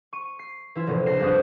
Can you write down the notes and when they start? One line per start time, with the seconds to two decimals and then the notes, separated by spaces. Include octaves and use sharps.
0.13 C#6 D#7
0.39 C7
0.75 E3 E4 F4
0.87 F1 A#1 A2
1.06 C#2 A#6 C7 E7
1.19 C2 F2 D4 B4 D#6